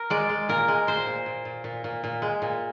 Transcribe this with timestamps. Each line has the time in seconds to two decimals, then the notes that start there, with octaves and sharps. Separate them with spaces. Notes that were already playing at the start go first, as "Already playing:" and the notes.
Already playing: A#4
0.10 G#3 D5
0.29 G#3
0.49 A#2 A#4
0.68 G#3
0.87 A#2 C5
1.07 A#2
1.26 A#2
1.45 A#2
1.64 A#2
1.84 A#2
2.04 A#2
2.22 G#3
2.42 A#2